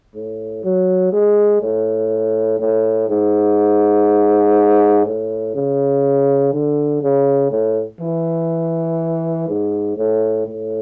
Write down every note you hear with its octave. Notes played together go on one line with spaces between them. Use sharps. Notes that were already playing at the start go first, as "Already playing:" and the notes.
A2
F#3
G#3
A2
A2
G#2
A2
C#3
D3
C#3
A2
E3
G#2
A2
A2